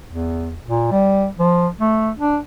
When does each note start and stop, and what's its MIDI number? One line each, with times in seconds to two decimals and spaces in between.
0.08 0.55 40
0.66 0.88 46
0.92 1.26 55
1.40 1.68 53
1.80 2.11 57
2.19 2.38 62